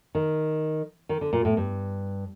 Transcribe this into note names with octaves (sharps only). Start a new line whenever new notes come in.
D#3
D#3
D3
A#2
A2
G2